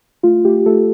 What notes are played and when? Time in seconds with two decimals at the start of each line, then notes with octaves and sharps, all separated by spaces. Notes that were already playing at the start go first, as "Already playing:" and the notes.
0.23 A3 F4
0.45 A3 G4
0.66 A3 A4